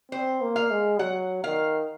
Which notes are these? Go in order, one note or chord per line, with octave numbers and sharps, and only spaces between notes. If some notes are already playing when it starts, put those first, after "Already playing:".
C4 C5
A#3
F5
G#3
F#3 F#5
D#3 F5